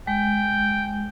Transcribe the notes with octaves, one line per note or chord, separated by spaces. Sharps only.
G#3 G5